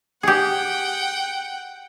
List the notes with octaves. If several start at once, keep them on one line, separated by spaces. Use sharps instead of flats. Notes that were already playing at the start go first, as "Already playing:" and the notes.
G4 G#4 F#5 G5